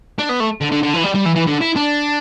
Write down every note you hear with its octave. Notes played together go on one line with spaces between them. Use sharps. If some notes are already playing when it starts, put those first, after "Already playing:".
D4
B3
A3
D3
D3
D3
E3
G3
G3
E3
E3
D3
E4
D4